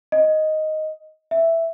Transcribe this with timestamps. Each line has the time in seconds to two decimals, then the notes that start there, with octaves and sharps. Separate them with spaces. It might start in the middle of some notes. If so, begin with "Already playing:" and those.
0.12 D#5
1.31 E5